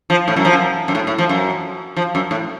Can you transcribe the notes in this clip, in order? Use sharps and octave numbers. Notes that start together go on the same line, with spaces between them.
F3
A2
F#2
F3
F#2
F#2
A2
A2
F3
F#2
F3
F#2
A2